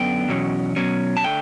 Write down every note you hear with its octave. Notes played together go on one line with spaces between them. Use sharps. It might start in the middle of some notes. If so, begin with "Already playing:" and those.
Already playing: F#2 D3 B3 G5
E2 B2 F#3 C#4
B2 F#3 C#4
A5
D3 A3 G5